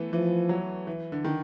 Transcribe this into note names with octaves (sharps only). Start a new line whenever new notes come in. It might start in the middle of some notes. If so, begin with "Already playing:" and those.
Already playing: E3 A3 B3
E3 F3
F#3
E3
D3
D#3